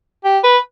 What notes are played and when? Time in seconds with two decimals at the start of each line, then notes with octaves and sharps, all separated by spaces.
0.24 G4
0.44 B4